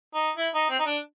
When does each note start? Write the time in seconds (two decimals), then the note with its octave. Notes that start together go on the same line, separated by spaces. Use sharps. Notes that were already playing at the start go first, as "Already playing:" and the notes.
0.15 D#4
0.37 E4
0.54 D#4
0.70 C4
0.79 D#4
0.86 D4